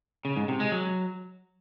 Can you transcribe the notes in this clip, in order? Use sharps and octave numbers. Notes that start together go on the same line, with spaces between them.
C#3
G#2
C3
G#3
F#3